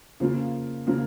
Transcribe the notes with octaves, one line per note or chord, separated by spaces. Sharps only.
C#3 F3 A#3 F4
C#3 F3 A#3 F4